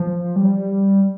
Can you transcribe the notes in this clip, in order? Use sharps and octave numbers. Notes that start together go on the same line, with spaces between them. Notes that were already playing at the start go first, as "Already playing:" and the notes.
Already playing: F3
G3